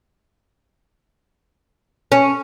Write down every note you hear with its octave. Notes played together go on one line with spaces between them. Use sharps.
C#4